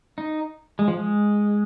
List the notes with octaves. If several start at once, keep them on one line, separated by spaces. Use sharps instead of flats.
D#4
G#3
F3
G#3